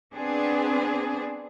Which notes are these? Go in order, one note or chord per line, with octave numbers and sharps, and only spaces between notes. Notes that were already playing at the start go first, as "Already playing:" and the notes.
B3 C4 D4 G#4